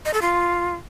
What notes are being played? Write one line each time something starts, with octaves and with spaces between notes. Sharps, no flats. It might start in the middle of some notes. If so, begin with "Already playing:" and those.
D#5
A4
F4